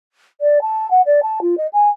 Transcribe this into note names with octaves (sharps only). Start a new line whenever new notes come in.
D5
A5
F#5
D5
A5
F4
D#5
G#5